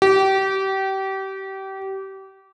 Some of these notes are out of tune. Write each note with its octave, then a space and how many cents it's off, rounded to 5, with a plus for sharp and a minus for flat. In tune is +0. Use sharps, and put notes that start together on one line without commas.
G4 -30